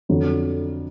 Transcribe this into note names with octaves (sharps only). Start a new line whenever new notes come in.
F2 D3 F#3